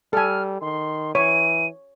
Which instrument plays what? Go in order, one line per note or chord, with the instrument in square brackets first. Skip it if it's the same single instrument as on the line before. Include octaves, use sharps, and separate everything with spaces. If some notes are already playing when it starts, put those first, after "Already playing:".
[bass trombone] G3 [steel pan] A4 G#5 [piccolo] F6
[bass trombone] D#3 [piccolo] C6
[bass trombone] E3 [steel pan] C#5 [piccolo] D#7